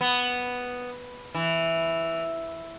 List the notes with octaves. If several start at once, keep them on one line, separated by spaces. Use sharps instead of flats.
B3
E3